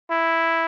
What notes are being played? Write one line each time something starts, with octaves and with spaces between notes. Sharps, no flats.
E4